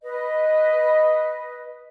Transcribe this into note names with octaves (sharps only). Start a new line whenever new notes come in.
B4 D#5